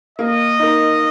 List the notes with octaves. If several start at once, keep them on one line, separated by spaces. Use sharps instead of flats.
A#3 D#5
D#4 A#4